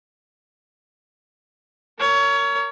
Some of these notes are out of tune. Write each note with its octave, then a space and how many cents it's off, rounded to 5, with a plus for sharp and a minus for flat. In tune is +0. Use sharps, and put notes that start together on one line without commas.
A#4 -15 C#5 +25